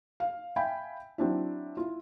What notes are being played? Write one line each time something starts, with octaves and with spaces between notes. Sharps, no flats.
F5
E5 F5 G5 G#5 B5
F#3 C4 D4 E4
E4 F4